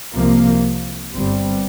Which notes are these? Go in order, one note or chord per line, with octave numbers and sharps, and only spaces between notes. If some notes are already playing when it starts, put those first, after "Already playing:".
C2 C3 F3 A#3
G1 G2 G3 C4